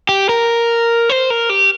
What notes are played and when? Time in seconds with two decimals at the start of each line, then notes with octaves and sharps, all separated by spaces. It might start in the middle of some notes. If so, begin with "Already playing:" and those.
0.09 G4
0.29 A#4
1.10 C5
1.30 A#4
1.49 G4